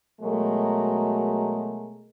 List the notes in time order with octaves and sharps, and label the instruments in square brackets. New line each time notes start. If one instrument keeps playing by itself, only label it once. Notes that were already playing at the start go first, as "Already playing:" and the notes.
[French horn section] B2 F#3 G#3 A3 A#4